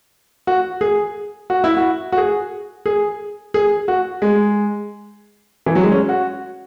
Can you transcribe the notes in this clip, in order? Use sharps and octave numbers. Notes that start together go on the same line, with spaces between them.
F#4
G#4
F#4
E4
F#4
F#4
G#4
G#4
G#4
F#4
G#3
E3
F#3
G#3
C#4
F#4